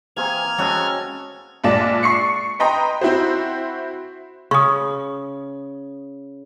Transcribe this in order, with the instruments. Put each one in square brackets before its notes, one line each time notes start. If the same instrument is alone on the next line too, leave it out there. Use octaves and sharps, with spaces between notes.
[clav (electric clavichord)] E3 C4 G#5 [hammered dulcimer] A#3 G#4 [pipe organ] F6 G#6
[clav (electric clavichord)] G#3 C4 F#4 [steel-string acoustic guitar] C#4 C#5 E5 [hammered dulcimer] A4 D#5
[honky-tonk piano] A#1 G#3 F4 D5 A5 E7
C#6 C7 C#7
B4 D#5 G5 A#5 C6
C4 E4 F#4 C5
[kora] C#3 [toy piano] C#6 D#6